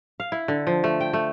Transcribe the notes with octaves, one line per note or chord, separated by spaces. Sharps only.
F5
E4
D3
F3
A3
G5
A3